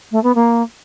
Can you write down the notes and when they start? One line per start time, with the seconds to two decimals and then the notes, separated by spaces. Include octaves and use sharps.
0.12 A3
0.23 B3
0.35 A#3